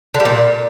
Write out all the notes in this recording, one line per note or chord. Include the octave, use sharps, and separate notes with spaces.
D3
G3
A#2